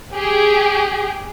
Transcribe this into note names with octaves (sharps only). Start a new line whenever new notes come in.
G4 G#4 G5